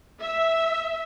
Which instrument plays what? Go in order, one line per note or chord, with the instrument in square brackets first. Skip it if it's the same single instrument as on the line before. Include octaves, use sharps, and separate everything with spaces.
[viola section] E5